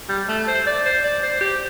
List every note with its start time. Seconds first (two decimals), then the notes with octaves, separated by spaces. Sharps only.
0.09 G3
0.29 A3
0.47 C5
0.67 D5
0.86 C5
1.04 D5
1.23 C5
1.41 G4